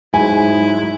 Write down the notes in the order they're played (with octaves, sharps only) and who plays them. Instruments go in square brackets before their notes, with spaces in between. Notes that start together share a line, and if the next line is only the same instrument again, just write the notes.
[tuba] G#2 [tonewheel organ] F#3 G#3 [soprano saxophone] E4 [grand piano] G#5